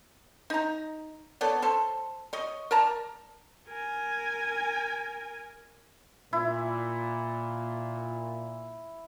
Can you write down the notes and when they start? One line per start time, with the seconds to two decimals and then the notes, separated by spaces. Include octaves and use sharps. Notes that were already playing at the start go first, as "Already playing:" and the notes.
0.50 D#4 A#5
1.41 B3 A4 C#5 D5
1.62 A4 C5
2.33 C#5 D#5
2.71 A#4 D5 A5 A#5
3.68 A#4 G#5
6.33 A#2 E4